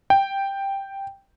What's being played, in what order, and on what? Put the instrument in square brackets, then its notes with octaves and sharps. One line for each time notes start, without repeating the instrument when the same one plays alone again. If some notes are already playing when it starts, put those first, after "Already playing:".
[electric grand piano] G5